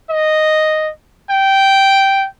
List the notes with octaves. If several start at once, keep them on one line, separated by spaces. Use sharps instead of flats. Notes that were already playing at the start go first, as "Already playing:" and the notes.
D#5
G5